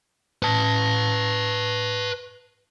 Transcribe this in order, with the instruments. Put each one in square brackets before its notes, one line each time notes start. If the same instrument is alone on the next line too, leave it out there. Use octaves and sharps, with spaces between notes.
[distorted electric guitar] B4 A5